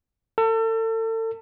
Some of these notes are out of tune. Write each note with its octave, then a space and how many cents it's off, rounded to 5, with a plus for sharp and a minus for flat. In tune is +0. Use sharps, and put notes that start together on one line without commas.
A4 +35